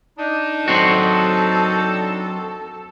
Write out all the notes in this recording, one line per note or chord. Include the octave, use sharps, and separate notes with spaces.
D4 D#4
F#3 C4 F#4 A4